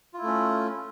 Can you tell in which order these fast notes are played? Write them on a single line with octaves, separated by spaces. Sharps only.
F4 E4 A3 C#4